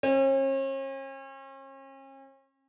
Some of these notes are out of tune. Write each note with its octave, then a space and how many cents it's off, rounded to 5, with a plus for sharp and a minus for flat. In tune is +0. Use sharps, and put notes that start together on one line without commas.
C#4 -40